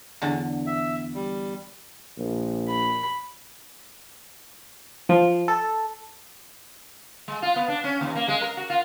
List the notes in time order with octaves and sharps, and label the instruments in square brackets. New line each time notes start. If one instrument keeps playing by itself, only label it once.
[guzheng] E2 D3
[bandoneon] E5
G3
[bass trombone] A#1
[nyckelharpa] B5
[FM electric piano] F3
A4
[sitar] G#3
F4
B3
D4
C#4
D#2
A#3
G#3
A#4
F#4
F4